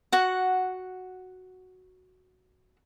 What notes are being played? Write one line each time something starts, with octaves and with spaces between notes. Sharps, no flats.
F#4 F#5